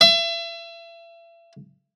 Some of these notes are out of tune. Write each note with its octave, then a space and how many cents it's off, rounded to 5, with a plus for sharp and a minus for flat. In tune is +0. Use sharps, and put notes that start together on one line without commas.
E5 +35